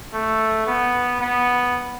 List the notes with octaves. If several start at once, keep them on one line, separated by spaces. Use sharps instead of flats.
A3
B3
B3